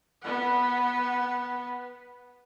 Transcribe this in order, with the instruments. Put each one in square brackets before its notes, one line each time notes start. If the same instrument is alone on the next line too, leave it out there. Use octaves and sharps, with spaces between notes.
[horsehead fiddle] B3 F#5